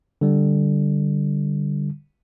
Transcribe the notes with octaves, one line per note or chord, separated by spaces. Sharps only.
D3 G3